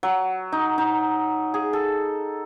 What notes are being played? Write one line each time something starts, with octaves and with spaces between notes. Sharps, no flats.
F#3
D#4
D#4
G#4
A4